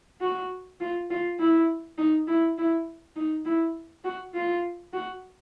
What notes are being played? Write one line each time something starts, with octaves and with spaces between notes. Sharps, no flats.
F#4
F4
F4
E4
D#4
E4
E4
D#4
E4
F#4
F4
F#4